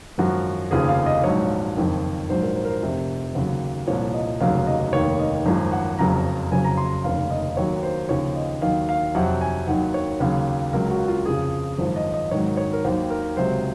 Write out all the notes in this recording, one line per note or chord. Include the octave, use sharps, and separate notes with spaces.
G#1 F#2 F3 F#4
F1 D#2 C#3 F3 G#4
F5
D#5
A#1 G#2 F#3 C#5
F#1 F2 D#3
A#1 G#2 F#3 C5
A#4
C5
A#4
C5
F1 F2 C3
D#2 C#3 F#3
C2 A#2 F3 C#5
D#5
F1 D#2 C#3 F#3 F5
D#5
F1 D#2 D#3 C#5
D#5
G#1 F#2 F3
F#5
F#1 F2 C#3 F#3 A#5
F#1 F2 C#3 F#3 G#5
A#5
C6
F1 D#2 C#3 F5
D#5
D#2 D#3 F#3 C#5
C5
D#2 C#3 F3 C#5
D#5
D#2 D#3 F#3 F5
F5
F2 C3 F#3 F#5
G#5
D#2 D#3 F#3 F#5
C#5
D#2 C#3 F#3
C#2 C#3 F#3 A#4
F#4
F4
F2 C#3 F3 G#4
G#1 F#2 F3 C5
D#5
D#5
G#1 G#2 D#3 F#3 C#5
C#5
A#4
D#2 D#3 F#3 C5
A#4
C#2 C3 F#3 C5